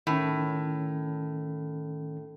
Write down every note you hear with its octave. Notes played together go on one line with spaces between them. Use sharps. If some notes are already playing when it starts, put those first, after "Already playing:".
A2 D#3 C#4